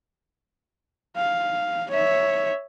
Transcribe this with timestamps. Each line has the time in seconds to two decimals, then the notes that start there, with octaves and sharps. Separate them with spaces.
1.16 F5
1.90 C#5 E5